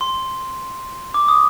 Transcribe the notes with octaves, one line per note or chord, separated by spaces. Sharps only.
C6
D6
D#6